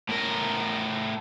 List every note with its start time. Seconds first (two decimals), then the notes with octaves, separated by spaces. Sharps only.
0.09 A2 A#4